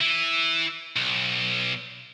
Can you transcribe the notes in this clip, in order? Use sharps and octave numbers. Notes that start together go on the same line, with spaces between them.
E3
B1